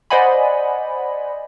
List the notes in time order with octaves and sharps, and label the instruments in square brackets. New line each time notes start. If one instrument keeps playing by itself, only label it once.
[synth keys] C5 D5 D#5 F#5 G#5 B5